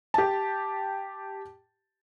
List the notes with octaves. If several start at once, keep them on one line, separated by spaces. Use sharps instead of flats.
G4 A5